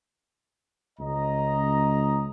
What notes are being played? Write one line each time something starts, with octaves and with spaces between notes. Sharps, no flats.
C#2 D#5 A#5